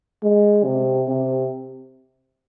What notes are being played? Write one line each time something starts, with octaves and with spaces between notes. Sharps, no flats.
G#3
C3
C3